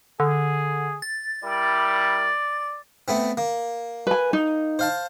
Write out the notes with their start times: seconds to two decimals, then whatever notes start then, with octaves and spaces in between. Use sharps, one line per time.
0.20 D3 G#4
1.02 A6
1.44 G3 E4 A#4 D5
3.08 A3 B3 C4
3.37 A#3
4.07 B4 G#5
4.33 D#4
4.79 C5 F5 A5